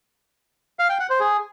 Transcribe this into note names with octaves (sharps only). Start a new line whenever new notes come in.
F5
G5
F#5
C5
G#4